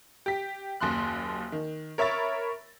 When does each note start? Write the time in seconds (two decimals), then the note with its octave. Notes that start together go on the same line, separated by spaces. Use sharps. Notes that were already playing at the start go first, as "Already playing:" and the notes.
0.26 G4 B6
0.80 F#1 D#2 C6 F#6
1.52 D#3
1.98 A#4 C#5 E5 B5 C#6 A6